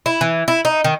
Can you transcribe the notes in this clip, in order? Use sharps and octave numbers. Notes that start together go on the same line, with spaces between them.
E4
E3
E4
D#4
D#3